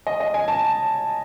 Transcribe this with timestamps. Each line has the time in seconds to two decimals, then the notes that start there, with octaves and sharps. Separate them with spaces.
0.07 D#5
0.20 D#5
0.34 G#5
0.48 A5